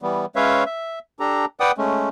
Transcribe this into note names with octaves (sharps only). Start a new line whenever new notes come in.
E3 G3 B3
G#3 C#4 B4 C#5 E5 F5
E5
D4 G4 A4 A#5
B4 D5 F#5 G5 D#6
G#3 A3 C#4